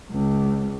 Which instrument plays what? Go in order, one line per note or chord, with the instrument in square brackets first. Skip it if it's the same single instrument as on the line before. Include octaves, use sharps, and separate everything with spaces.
[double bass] C#2